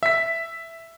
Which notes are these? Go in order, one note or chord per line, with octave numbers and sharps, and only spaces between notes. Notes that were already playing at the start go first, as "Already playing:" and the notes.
E5 B6